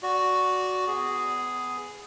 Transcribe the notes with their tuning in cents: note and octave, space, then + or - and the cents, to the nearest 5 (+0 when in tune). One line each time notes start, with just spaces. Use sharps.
F#4 +0 D5 -15
B3 +20 G#4 +0